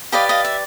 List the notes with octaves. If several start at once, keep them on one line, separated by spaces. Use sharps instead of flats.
G4 B4 D5 D#5 F5
D#5 F5
E5